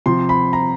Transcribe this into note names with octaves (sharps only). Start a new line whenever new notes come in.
C3 F3 C6
B5
A#5